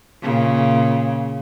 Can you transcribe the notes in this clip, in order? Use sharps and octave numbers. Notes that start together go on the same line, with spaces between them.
A#2 C#3